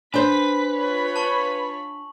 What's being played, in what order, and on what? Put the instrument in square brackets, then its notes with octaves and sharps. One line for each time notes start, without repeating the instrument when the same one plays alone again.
[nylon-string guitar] D4 C5 [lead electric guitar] B4 [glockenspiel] G#5 [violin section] B6
[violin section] F4 C#5 B5
[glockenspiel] A5 C#6 F#7